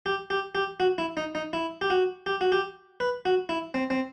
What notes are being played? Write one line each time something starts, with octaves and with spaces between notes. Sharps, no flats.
G4
G4
G4
F#4
E4
D#4
D#4
E4
G4
F#4
G4
F#4
G4
B4
F#4
E4
C4
C4